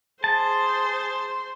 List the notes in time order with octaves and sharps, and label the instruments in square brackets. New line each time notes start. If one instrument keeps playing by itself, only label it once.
[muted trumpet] G#4 [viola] C5 [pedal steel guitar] A5